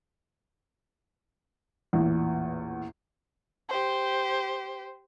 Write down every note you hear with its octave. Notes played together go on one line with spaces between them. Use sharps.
A1 E2 A#2
G4 C5